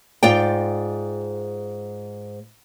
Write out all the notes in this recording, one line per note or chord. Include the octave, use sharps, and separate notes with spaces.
G#2 F4 D5 G5